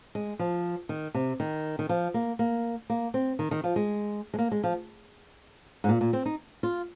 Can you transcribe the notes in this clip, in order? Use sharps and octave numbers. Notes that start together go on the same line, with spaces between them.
G#3
F3
D#3
C3
D#3
D#3
F3
A#3
A#3
A#3
C4
D#3
D#3
F3
G#3
G#3
A#3
G#3
F3
G#2
A#2
A#2
C4
D#4
F4